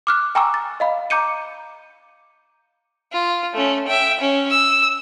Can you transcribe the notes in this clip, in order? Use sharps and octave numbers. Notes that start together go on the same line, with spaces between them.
D6 F6 F#6
G5 G#5 A#5 C#6 D6 E6
A6
D#5 F5 B5
A#5 D6 G6 C#7 D#7
F4
A3 C#4
E5 G5
C#4
E6